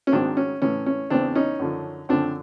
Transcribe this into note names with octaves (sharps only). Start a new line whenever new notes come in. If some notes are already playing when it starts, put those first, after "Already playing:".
C#4
G#2 D#3 F#3 C4 D4
C#4
A2 E3 C#4
C#4
E2 C#3 E3 C4 D4
C#4 D#4
F#2 D3 F3
F#2 D3 F3 C4 D4